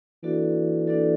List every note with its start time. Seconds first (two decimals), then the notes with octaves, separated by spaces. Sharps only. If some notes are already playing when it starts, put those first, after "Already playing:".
0.23 E3 A#3 D4 F#4 A4 D5
0.87 A#3 D4 F#4 A4 D5